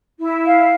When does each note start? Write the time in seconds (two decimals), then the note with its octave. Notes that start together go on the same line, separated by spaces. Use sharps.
0.19 E4
0.45 F5